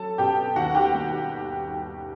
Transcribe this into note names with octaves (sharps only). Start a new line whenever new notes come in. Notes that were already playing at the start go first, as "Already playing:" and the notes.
Already playing: F#3 A4 A5
B2 G4 G5
D#2 F#4 F#5
G4 G5
G3